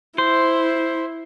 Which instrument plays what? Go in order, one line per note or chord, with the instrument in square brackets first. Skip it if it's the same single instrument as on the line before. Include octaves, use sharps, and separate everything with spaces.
[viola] E4 [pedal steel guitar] C5